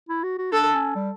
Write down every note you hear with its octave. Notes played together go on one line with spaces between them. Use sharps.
E4
F#4
F#4
D4 A4
C#4
G3